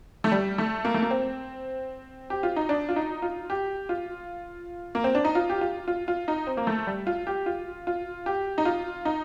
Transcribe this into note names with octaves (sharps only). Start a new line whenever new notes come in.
A3
G3
A3
A#3
A3
A#3
C4
G4
F4
D#4
D4
F4
D#4
F4
G4
F4
A#3
C4
D4
D#4
F4
G4
F4
F4
F4
D#4
C4
A#3
A3
G3
F4
G4
F4
F4
G4
D#4
F4
D#4